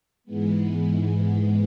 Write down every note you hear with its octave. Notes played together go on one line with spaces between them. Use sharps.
G#2 E3 G#3 B3